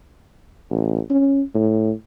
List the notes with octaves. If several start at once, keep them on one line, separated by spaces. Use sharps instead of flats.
A1
C#4
A2